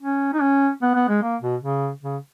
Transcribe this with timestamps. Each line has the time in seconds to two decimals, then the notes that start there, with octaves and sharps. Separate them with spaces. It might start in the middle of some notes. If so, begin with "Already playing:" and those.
0.01 C#4
0.34 D#4
0.41 C#4
0.82 B3
0.95 B3
1.08 G#3
1.22 A#3
1.42 B2
1.63 C#3
2.03 C#3